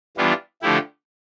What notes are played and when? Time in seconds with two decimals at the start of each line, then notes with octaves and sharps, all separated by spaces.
0.17 E3 G3 B3 D4 F4
0.62 D3 F3 A3 E4 G4